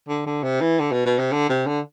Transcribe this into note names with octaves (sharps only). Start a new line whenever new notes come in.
D3
D3
C3
E3
D3
B2
B2
C3
D3
C3
D3